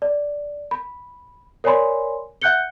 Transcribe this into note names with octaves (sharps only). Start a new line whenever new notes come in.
D5
B5
A#4 C#5 D5 G#5 B5 C6
E5 F#5 F#6 G6 C#7 G7